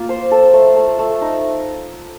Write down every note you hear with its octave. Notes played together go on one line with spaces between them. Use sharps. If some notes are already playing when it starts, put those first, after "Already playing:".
Already playing: A#3 F4
C5
A4
A3
A3
A3
D#4